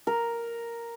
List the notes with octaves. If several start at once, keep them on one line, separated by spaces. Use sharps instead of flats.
A#4